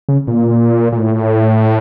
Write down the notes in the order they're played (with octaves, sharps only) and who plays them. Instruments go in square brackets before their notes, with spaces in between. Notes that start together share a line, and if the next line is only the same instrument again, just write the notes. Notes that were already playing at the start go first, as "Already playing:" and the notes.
[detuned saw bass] C#3
A#2
A#2
A2